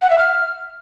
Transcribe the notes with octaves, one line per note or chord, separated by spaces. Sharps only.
F#5
E5
F6